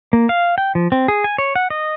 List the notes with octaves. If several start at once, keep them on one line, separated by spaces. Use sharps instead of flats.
A#3
F5
G5
F3
C4
G#4
G#5
C#5
F#5
D#5